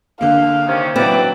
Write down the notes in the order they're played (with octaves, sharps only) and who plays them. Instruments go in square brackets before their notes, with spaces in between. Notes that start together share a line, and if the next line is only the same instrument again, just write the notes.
[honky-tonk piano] D3 A#3 [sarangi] F5
[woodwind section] C3 D#3 C#4
[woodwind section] E3 B4 D5 [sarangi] F#3 [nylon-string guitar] C4